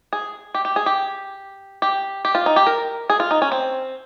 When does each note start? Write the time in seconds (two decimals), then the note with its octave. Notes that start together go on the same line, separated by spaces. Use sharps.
0.13 G#4
0.54 G4
0.65 G4
0.76 G#4
0.86 G4
1.82 G4
2.25 G4
2.35 F4
2.46 D#4
2.56 G4
2.67 A#4
3.10 G#4
3.20 F4
3.31 D#4
3.42 C#4
3.52 C4